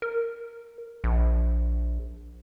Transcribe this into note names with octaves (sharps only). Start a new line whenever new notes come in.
A#4
A#1